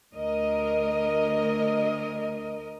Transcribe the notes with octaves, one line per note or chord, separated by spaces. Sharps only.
D2 A#4 D#5